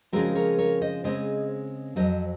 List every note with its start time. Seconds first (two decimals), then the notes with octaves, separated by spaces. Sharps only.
0.13 C#3 F3 G#3 C4 F#4 A#4
0.35 A#4 C#5
0.58 A#4 C#5
0.81 C5 D#5
1.04 C#3 G#3 C4 C5 D#5
1.96 F2 D#3 F#3 C5 D#5